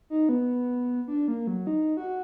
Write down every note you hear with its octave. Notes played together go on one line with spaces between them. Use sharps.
D#4
B3
D4
A#3
F#3
D#4
F#4